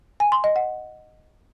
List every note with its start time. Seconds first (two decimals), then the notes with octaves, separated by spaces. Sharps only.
0.20 G#5
0.32 C6
0.44 D#5
0.56 F#5